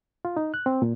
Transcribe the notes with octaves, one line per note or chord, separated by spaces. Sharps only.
F4
D#4
F#6
C4
A#2